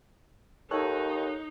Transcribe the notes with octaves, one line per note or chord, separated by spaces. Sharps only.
D#2 D#4 A4 C#5 F#6